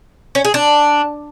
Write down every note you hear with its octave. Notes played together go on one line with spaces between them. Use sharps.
C#4
G#4
D4